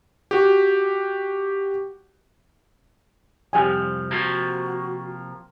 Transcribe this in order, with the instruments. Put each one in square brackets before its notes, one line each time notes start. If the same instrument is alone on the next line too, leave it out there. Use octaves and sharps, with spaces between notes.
[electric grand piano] F#4 G4
[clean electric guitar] C2 F2 F3 [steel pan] G4 G#5
[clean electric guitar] C3 F3 A#3 [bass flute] F#4